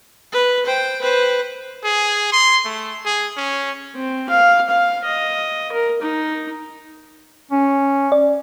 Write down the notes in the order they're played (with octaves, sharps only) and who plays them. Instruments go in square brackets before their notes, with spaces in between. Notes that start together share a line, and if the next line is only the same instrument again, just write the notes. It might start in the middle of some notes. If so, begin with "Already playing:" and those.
[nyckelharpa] B4
C5 G5
B4 C5
[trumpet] G#4
C6
A3
G#4
C#4
[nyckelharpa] C4
F5
F5
D#5
A#4
D#4
[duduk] C#4
[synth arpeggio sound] D5